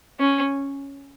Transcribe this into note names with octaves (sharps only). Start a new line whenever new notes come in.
C#4